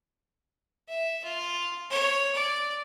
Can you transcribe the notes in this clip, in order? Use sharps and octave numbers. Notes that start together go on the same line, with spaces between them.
E5
F4
C#5
D5